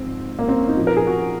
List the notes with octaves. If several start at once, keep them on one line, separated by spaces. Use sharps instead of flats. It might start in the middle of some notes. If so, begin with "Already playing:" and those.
Already playing: G#2 F3 C4
A#3
C4
C#4
D#4
A#2 F3
A#4
G#4
F#4